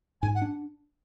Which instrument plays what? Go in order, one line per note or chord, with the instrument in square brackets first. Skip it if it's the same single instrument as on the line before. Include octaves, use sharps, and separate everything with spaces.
[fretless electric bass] G#2 [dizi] G#5
[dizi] F#5
[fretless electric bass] D4